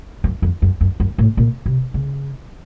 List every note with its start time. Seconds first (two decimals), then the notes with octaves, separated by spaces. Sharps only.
0.24 F#2
0.42 F2
0.62 F#2
0.81 F#2
1.00 F#2
1.18 A2
1.37 A#2
1.66 C3
1.94 C#3